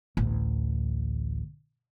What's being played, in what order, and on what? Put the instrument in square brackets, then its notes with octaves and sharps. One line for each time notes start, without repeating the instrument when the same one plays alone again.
[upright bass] A1 D2